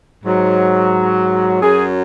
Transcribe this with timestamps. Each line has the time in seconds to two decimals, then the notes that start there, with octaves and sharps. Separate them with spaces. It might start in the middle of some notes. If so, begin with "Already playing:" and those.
0.24 G#2 F#3
1.61 F#2 F#3 G#4